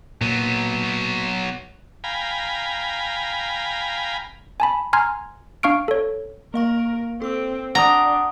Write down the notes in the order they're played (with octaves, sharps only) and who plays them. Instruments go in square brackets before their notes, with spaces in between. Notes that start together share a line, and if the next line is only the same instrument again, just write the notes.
[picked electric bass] A#2 [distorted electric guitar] F#3 B3
[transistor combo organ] F5 G5 G#5 A#5 B5
[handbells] G#5 A5 B5
G#5 A#5 C6 F6 G#6
D4 F5 C#6 F6 D7
A4 C#5
[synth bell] A#3 F5 C#6 [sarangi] A#4
[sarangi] C4 [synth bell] A4 E6
[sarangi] D4 [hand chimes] F#5 D#6 [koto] A#5 [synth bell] C#6 G7